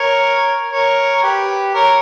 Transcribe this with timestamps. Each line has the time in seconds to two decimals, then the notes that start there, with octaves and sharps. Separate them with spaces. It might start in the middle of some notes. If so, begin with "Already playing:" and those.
Already playing: A#4 C#5
0.71 A#4 C#5
1.16 A#4
1.23 G4 B4
1.74 A#4 C#5